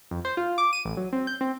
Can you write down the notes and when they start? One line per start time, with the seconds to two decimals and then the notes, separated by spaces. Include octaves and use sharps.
0.11 F2
0.25 C5
0.37 F4
0.58 D6
0.73 D#7
0.85 A1
0.97 F#3
1.13 C4
1.27 G6
1.41 C4